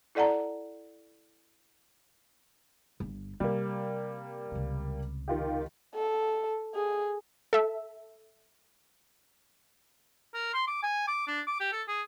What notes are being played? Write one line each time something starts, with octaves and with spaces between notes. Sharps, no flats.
E4 A4 D5 F#5 A5 A#5
G1
C3 G3 A#3
C#2 C3
D#3 F4 G4
A4
G#4
A4 E5
A#4
C6
D6
G#5
D6
D4
D6
G4
A4
G#4